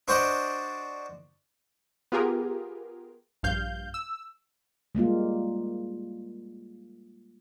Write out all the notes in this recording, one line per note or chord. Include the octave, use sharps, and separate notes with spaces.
D4 F#4 C5 D5 D#5
B3 F4 G4 G#4 A#4
A#1 G2 F5 G6
E6
G3 G#3 A#3 F4